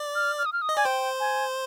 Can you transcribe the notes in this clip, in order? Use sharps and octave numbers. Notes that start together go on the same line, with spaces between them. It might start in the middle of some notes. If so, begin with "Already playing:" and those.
Already playing: D5
F6
F6
D#6
F6
D#6
D#5
D5 G#5
C5 G5
G#5